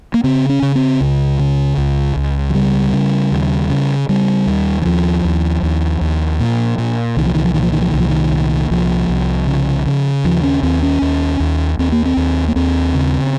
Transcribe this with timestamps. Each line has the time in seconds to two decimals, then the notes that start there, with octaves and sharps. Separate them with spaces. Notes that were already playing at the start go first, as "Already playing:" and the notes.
0.14 A#3
0.24 C#3 C4
0.49 C#4
0.62 C#3
0.75 C4
1.01 C#2
1.40 C#3
1.77 C#2
2.16 C#2
2.50 F3
2.55 C#3 G3
2.93 C#3
3.32 D#2
3.70 C#3
4.09 C#3 G3
4.47 D#2
4.82 D#3
4.85 D#2 F3
5.25 D#2
5.63 D#2
6.01 D#2
6.40 A#2
6.78 A#2
7.17 C2 D#3
7.26 F3
7.35 D#3
7.44 F3
7.54 A#2 D#3
7.63 F3
7.72 D#3
7.82 F3
7.91 C2 D#3
8.00 F3
8.09 D#3
8.32 A#2
8.71 C2 F3
9.09 C2
9.47 C#3
9.86 C#3
10.24 D#2 F3
10.43 C#4
10.63 D#2 C4
10.82 C#4
11.02 D#2
11.40 D#2
11.79 D#2 C4
11.92 A#3
12.05 C4
12.17 D#2
12.48 A#3
12.56 D#2 C4
12.94 C#3